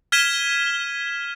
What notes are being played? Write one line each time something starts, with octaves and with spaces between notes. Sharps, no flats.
F6 G#6 B6 D#7 E7 G7